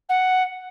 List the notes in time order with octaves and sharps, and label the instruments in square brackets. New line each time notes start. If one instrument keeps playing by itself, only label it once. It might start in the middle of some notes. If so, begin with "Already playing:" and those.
[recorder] F#5